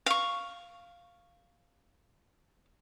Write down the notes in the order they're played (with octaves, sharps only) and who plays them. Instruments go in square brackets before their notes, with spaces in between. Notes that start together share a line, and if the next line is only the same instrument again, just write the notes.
[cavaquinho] F5 C#6